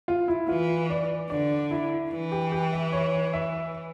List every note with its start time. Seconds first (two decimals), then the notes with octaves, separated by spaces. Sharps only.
0.08 F4
0.28 E4
0.49 E3 F4
0.90 D5
1.30 D3 D5
1.71 E4
2.11 E3
2.32 G4
2.52 G4
2.72 E5
2.92 C#5
3.33 E5